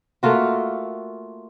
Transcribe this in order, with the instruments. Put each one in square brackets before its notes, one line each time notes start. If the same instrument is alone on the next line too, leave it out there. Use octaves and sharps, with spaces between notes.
[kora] A3 A#3 F4 F#4